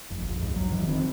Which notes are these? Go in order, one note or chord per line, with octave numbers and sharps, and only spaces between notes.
F#1 F2
A#1
D#2 G#2
F#3
F1 D#3 E3
D#3 C4